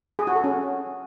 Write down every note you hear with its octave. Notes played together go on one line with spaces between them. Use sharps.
G#4
F#4
A4
C#4